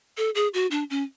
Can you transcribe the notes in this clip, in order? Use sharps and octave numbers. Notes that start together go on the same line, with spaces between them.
A4
G#4
F#4
D4
C#4